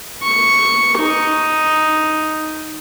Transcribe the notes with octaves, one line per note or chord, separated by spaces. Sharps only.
C#6
D#4